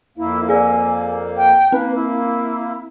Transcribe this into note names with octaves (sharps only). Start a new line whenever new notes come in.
F2 A#3 E4
G#4 D5 G#5 E6
G5
A#3 C4 B4
E4